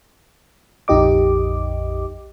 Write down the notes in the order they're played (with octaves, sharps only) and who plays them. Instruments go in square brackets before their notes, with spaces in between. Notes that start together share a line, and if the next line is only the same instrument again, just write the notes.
[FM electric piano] A#1 F2 D#4 G4 D#5 D6